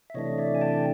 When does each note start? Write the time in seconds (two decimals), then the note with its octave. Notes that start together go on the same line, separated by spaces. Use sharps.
0.10 E5
0.14 C3 E3 A3 D4 C#5 D#5
0.38 D5 E5
0.55 G#5
0.61 G5 A5